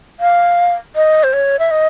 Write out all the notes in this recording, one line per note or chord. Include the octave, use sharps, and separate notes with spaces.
F5
D#5
C5
C#5
E5
D#5